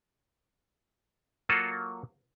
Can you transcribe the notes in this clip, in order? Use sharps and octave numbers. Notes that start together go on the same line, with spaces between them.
F#3 A#3 F4 F#4 A4